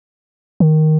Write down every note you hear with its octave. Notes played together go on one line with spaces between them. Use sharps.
D#3